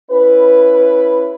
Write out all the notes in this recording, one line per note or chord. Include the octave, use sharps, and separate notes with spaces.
C#4 E4 B4